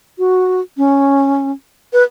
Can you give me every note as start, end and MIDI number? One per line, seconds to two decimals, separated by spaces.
0.18 0.60 66
0.77 1.51 61
1.93 2.03 71